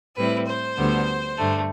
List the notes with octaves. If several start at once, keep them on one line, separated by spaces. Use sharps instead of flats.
A2 G3 C4 E4 B4
C5
D2 D3 G3 B3
G2 D3 A3